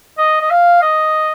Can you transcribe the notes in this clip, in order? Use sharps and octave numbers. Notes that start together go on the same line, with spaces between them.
D#5
D#5
F5
D#5